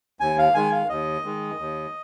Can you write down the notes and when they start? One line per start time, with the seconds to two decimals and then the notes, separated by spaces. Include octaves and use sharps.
0.20 D#2 G#5
0.38 F5
0.54 D#3 G#3 G#5
0.72 F5
0.89 D#2 D#5
1.25 D#3 G#3
1.59 D#2